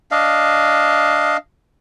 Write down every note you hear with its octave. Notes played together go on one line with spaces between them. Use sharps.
D4 D#5 F5